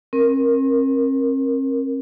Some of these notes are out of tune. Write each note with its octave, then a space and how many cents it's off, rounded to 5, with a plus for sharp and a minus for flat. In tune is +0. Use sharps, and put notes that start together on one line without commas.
C4 +45 A#4 +0